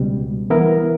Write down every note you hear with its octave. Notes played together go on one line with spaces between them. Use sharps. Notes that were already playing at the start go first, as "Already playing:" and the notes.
Already playing: C#2 B2 G3
E3 B3 E4 A#4